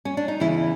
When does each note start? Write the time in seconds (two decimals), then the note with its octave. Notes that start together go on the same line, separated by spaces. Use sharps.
0.05 C#4
0.17 D4
0.28 D#4
0.40 E2 C#3 E3 E4